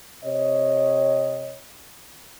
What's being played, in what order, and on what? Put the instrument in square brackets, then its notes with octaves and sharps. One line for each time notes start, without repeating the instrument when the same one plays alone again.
[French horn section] C3 C#5 D#5